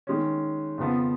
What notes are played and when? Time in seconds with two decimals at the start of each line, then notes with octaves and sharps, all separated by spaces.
0.07 D#3 G#3 C#4
0.78 F2 C#3 F3 B3